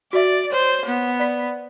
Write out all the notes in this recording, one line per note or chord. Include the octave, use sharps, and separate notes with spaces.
F#4 D5 E5
C5 C#5
B3
D5 B5 B6